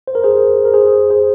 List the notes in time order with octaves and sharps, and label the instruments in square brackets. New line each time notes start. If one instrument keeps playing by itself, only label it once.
[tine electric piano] C5
A#4
G#4 C5
A#4
G#4 C5
G#4 C5